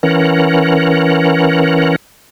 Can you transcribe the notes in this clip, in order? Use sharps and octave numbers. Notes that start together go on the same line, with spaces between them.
E3 C#4 A#4 F#5